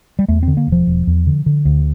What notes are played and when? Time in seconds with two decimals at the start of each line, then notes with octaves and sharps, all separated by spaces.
0.19 G3
0.28 E2 A3
0.43 D3 C4
0.57 A#3
0.67 E1
0.72 F3
0.87 E1
1.07 E2
1.27 D3
1.46 D3
1.65 D2